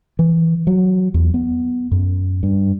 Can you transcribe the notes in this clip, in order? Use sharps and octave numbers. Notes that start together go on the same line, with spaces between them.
E3
F#3
E2
B3
F#2
G2